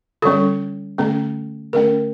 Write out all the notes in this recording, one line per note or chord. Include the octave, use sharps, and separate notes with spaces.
D3 G3 C#4 A4
D3 A3 C#4
D3 A3 C#4 A#4